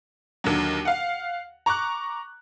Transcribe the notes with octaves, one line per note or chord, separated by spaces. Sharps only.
D#2 D3 F#3
F5 F#5
A#5 C#6 D6 F#6